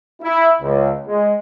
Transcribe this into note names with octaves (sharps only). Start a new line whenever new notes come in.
E4
C#2
G#3